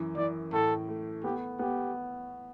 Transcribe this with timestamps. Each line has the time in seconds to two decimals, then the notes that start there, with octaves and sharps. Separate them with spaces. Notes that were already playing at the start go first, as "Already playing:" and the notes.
Already playing: F#2 E3
0.17 E3 D5
0.53 A2 A4
0.89 A3
1.24 B3 G4
1.59 B3 G4